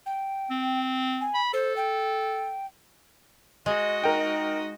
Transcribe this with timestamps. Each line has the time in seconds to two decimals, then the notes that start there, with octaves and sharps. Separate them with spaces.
0.06 G5
0.51 C4
1.21 G#5
1.34 B5
1.53 A4 C5
1.77 G5
3.66 G#3 F#4 D#5
4.04 D#4 A#4 G5